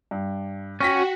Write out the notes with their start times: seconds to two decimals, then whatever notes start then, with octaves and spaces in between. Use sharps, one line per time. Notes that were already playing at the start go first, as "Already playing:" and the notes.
0.11 G2
0.81 C#4 F#4 G5 A#6 B6